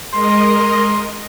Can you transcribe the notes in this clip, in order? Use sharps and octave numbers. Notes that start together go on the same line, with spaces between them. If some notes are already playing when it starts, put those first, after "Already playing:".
G#3 A#4 D#5 C6